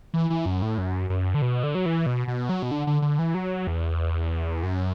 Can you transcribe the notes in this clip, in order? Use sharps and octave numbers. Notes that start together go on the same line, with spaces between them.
E3
E3
F#2
A2
F#2
F#2
D3
B2
D3
F#3
E3
B2
B2
F#3
B2
D3
D3
D3
E3
F#3
E2
F#2